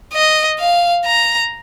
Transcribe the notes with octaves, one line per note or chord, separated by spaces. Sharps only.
D#5
F5
A#5